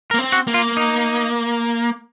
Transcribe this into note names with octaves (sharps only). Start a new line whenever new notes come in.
A#4
A#3
C4
F#4
A#3
F4
D#4